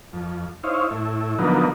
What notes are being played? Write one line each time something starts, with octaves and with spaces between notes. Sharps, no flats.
F2
D#4 E4 C5 C#5 F5
A2 E4
D3 F3 F#3 A#3 B3 D#4